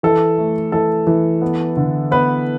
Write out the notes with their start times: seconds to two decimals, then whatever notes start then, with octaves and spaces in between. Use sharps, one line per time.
0.03 E3 A4
0.38 A3
0.72 E3 A4
1.07 E3
1.42 B3
1.77 D3
2.11 B3 B4